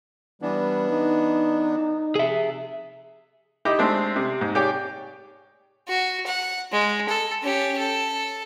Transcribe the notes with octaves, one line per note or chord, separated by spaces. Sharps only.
E3 G3 B3 D4
D#4
C3 G#4 E5
D#4 E4 G4 D#5
G#3 A3 C4 D4
C3
G#2
G4 G#4 C#5 D5 G5
F#4
F#5
G#3
A4
C#4 G4
A4